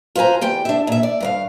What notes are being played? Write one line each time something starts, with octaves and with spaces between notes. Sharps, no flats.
F4 B4 C5 G#5 A#5
E2 G4 G5
D4 E5
A#2 E5
D5
G2 B4 F5